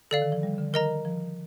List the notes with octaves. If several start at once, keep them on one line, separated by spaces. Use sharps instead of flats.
D3 A4 D5 F5
D#3
F3
G3
D3
D#3 A#4 D#5 A#5
F3